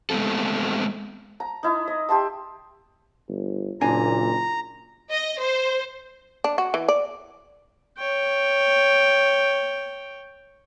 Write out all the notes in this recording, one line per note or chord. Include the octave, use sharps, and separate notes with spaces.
G#3 A3 B3 C4 A4
A#5
D#4 E4
D#5
G4 E5 A5 C6
G1
F#1 A#2 D4 G#5 A#5
D#5
C5
D4
F#4
E3
D5
C#5 G5